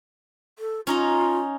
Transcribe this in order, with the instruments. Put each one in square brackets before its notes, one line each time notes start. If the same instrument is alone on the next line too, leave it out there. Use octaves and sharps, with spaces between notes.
[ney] A4
[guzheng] C#4 D#4 A#5 [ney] F4